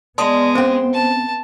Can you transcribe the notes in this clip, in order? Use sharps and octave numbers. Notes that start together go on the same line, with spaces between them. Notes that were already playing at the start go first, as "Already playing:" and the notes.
G#3 B3 D5 D#5 A5 C6 D#6
C4 C#4 C5 G5
A5